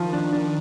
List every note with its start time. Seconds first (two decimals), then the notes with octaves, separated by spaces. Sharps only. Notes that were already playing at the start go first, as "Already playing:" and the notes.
Already playing: D#3 F3
0.13 D4
0.33 D4